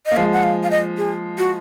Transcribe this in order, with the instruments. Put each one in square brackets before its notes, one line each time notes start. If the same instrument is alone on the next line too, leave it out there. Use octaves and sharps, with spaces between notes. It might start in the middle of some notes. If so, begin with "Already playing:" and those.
[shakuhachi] D#5
[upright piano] A#3
[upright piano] F3 G#3 [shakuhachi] F5
[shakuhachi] F#5
F5
F5
D#5
G#4
F#4